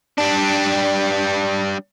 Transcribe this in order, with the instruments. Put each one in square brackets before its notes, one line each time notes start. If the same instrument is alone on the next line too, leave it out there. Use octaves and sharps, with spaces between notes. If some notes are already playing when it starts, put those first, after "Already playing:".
[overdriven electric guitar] G3 D4